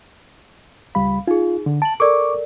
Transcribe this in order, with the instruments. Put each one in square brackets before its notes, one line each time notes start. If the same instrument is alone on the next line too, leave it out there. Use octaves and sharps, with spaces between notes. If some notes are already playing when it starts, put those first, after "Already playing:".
[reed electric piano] C#2 G3 B5 [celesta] F5
[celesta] D#4 G#4 [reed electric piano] F4
[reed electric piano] D3
[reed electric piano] A5 [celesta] D7 F#7
[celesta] A4 A#4 D5 [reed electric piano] C#6 D6